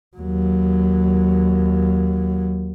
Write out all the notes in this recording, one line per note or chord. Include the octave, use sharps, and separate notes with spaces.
D#2 F#3